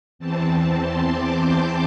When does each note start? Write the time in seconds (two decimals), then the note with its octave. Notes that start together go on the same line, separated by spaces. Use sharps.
0.19 E2 E3 C4 A5
0.81 C6
1.10 D6
1.40 G6